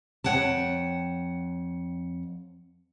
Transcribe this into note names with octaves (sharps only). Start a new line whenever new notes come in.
F2 C#5 F#5 G5 A5